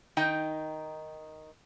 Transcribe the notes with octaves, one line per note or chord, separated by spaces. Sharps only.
D#3 D#4 D#5 G5